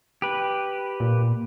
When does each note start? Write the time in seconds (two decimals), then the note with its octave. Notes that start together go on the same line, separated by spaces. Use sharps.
0.22 G4 B4
1.00 A#2